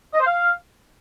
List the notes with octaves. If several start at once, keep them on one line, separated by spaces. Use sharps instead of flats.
D#5
C5
F5